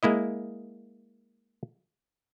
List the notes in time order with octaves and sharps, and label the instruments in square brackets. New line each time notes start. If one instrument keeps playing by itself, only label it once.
[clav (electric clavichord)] G#3 A#3 E4 D#5